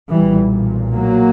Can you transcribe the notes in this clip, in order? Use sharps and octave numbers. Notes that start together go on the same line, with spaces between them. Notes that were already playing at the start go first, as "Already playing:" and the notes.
B1 A#2 E3 G3
F#3 A#3